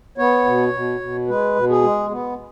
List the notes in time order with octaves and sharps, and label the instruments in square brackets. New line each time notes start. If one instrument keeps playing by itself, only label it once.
[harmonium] B3 C#5
B2
B2
B2
G#3 B4
B2
G#4
G#3
B3